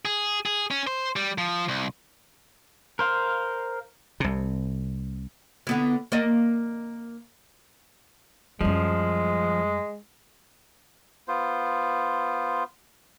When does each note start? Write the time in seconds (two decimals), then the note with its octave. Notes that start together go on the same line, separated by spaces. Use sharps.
0.05 G#4
0.46 G#4
0.71 C#4
0.87 C5
1.16 G3
1.38 F3
1.69 C2
2.99 A#4 C5 F5
4.20 C2 C3
5.67 D3 B3 E4
6.12 A#3 D5 D#5
8.61 F#2 F3 G3 G#3
11.28 B3 F4 C5